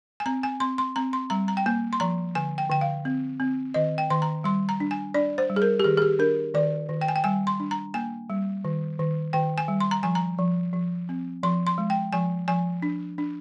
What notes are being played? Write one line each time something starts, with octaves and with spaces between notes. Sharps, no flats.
G#5
C4 A#5
G#5
C4 C6
C6
C4 A#5
C6
G3 A#5
A#5
G5
A#3 G#5
C6
F3 A#5
D3 G#5
G5
D3 G5
F5
C4
C4
D#3 D#5
G5
D#3 C6
A#5
G3 C6
A#5
D4
G#5
D4 D5
C5
G3
G#4
A#4
G4
D#3 G#4
G#4
G4
D4 A#4
D#3 D5
D#3
G5
G#5
G5
G3 G#5
C6
D4
A#5
A#3 G#5
G3
D#3
D#3
D#3 G5
G#5
G3
C6
A#5
F3 G#5
A#5
F3
F3
C4
F3 C6
C6
G#3
G5
F3 G#5
F3 G#5
D4
D4